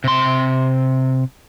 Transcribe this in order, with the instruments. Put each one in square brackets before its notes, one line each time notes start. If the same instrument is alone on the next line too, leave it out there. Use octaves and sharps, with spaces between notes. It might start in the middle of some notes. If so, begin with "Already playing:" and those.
[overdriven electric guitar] C3 C6